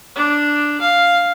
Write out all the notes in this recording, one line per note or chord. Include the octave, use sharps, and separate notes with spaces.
D4
F5